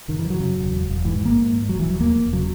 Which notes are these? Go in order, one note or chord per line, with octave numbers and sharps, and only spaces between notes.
F#1 D#3
E3
F#2
F#3
C#3
E1
E1
E1
G#2 E3
G#1
A#3
G#2
G#2
E1 F#3
E3
E1
F#3
E2 A#3
E1
C#3 F#3